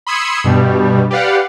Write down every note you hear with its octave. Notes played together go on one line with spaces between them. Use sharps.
B5 C6 D#6 E6 G#6 C#7
G2 B2 G3
G4 B4 D5 F5 F#5